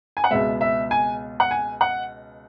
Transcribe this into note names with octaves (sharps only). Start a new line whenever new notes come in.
G#5
F#5
C#2 B2 G#3 B3 E5
E5
G#5
F#5
G#5
F#5